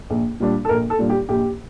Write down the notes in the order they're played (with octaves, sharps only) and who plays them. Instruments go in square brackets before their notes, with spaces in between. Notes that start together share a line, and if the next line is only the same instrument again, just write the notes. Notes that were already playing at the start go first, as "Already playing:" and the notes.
[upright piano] A#1
A#2 G3 D4
A4
A#1 A#4
A4
A#2 G3 D4
G4
A#1 G4